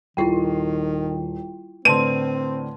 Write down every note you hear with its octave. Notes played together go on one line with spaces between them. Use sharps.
D#1 D#3 E4 F4 G5 C7
A2 D3 C4 B4 A5 C6 D#7